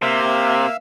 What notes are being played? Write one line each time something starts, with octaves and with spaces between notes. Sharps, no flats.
C3 A#3 E5 F5 E6